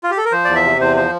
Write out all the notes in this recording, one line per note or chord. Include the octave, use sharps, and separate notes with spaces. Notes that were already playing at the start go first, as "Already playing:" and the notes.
F4
G4
A4
A#4
F3 C5
E2 D5
E5
C3
E2 C5
F3 C5